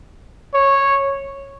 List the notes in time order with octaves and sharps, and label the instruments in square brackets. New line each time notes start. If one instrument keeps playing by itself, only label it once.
[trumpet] C#5